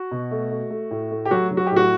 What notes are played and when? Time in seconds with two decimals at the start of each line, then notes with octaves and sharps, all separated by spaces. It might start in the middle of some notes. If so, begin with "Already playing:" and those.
Already playing: F#4
0.11 B2
0.31 A3
0.51 A3
0.70 A3
0.91 A2
1.11 A3
1.26 G4
1.31 F#3 F#4
1.51 F#3
1.57 F#4
1.66 G4
1.71 A2
1.76 F#4